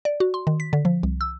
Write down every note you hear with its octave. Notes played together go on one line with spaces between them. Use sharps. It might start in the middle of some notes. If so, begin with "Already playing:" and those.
D5
F#4
C6
D#3
B6
D3
F3
C2
E6